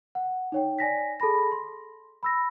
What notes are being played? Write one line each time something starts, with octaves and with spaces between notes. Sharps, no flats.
F#5
D#4 C#5 G5
D5 G#5 A#6 B6
G#4 A4 A5 B5 A#6
C6
B5 E6 A#6